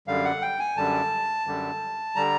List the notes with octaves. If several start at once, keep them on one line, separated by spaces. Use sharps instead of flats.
F#2 D3 G3 F5
F#5
G5
G#5
F#2 D3 G3 A5
F#2 D3 G3
D3 G3 A#5